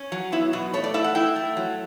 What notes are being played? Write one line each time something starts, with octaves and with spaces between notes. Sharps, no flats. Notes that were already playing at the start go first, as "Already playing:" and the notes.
Already playing: C#4
F#3
B3 E4
B2 F#4
A3 C#5
D5
E4 E5
F#5
E4 G5
A3
F#3